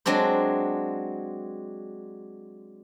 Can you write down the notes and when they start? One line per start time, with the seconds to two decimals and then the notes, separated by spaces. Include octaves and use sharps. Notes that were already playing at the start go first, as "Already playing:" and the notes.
0.06 F#3 G#3 C4 D4 C5